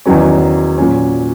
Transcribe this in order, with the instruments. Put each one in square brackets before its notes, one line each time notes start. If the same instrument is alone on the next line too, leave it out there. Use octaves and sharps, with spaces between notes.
[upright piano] E2 D#3 F#3 C#4
A#2 F#3 C#4